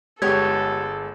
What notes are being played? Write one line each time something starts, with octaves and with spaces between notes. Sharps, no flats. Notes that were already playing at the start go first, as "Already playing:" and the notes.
G1 G#3 B3 G4 A4 C#5 G#6